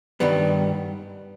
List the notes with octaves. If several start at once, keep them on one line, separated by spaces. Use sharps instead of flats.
G2 D#3 G3 B3